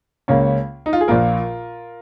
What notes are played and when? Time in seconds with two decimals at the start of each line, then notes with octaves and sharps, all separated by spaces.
0.28 C#2 C#3 A#3 C#4
0.86 D#4
0.93 F4
1.01 G#4
1.08 A#1 A#2 A#3 F4 A#4